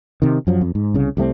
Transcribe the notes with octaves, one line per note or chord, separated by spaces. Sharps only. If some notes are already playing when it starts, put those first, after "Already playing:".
C3 D#3
F#2 F3 F#3
F2
G#2
C2 C#3
C2 G3 A3 C4